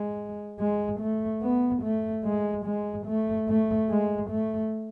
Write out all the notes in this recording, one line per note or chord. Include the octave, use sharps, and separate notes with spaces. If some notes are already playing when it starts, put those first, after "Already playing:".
Already playing: G#3
G#3
A3
B3
A3
G#3
G#3
A3
A3
G#3
A3